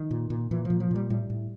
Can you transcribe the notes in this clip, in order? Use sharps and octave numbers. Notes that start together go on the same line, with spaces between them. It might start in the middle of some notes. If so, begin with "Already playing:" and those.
Already playing: D#3
A#2
A#2
A#2 E3
A#2 F3
F3
A#2 G3
A2 G3
A2